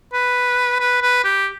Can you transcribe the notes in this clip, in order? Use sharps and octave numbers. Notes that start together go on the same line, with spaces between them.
B4
B4
B4
G4